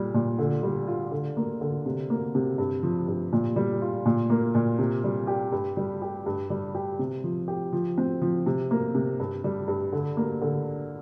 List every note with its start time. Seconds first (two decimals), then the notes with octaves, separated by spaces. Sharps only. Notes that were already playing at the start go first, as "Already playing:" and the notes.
Already playing: A#2 G3
0.14 A#2
0.39 D3
0.63 G3
0.87 F4
1.11 D3
1.37 A#3
1.61 D3
1.86 C3
2.10 A#3
2.35 C3
2.58 G2
2.83 F3
3.08 G2
3.32 A#2
3.56 G3
3.82 F4
4.06 A#2
4.30 A#3
4.55 A#2
4.79 C3
5.04 G3
5.27 G4
5.52 G2
5.77 G3
6.02 G4
6.26 G2
6.50 G3
6.75 G4
6.99 C3
7.24 F3
7.48 G4
7.73 F3
7.98 C4
8.22 F3
8.46 C3
8.71 A#3
8.95 C3
9.20 G2
9.44 G3
9.68 G2
9.93 D3
10.17 A#3
10.42 D3